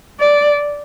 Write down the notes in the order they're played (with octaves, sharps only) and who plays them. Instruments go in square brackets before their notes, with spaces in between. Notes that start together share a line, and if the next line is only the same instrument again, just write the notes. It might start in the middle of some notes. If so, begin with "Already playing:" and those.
[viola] D5